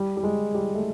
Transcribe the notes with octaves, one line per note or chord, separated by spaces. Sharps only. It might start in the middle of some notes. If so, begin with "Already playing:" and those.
Already playing: G3
G3
G#3
G3
A3